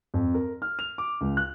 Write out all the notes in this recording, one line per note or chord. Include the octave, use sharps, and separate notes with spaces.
F2
A#4
F6
F7
D6
C#2
F#6